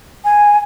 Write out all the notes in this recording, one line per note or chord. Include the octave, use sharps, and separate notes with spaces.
G#5